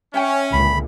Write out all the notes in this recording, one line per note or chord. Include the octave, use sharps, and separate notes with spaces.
C#4 E5 G5 G#5
C#2 A#2 D3 B5